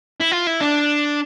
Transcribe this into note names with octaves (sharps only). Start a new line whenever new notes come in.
E4
F4
E4
D4